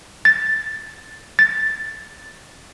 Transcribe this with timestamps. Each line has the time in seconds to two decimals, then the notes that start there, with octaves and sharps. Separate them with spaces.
0.25 A6
1.39 A6